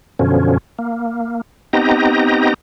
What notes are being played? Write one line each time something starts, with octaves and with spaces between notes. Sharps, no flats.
F#2 B2 D3 F3 C#4
A#3
B3 C4 D#4 G4 D#5 A#5